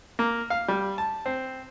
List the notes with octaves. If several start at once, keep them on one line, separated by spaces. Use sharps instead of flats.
A#3
F5
G3
A5
C4